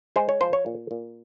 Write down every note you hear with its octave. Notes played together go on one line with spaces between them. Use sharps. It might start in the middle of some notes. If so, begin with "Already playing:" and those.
G#3 C5
C#5
F3 C5
C#5
A#2
A#2